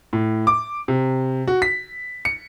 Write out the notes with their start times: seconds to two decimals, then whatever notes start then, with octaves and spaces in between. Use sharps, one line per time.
0.13 A2
0.47 D6
0.88 C3
1.48 F#4
1.62 B6
2.25 C#7